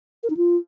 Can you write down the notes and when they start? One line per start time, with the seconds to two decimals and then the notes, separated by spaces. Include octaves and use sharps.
0.23 A#4
0.30 D#4
0.37 F4